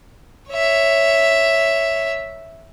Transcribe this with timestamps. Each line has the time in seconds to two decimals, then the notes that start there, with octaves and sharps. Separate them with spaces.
0.52 C#5 E5